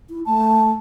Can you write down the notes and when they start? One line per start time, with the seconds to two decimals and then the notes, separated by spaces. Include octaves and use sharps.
0.09 E4
0.26 A3 A5